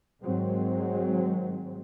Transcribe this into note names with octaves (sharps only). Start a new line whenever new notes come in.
G#2 D#3 F#3 G#3 C4